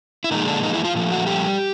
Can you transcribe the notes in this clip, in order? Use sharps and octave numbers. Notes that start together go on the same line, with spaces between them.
E4
A#2 D#3 F3 G#3 D#4
D3 D4
D#3 D#4
E3 E4
F3 F4
A#2 F3 A3
F#3 F#4
G3 G4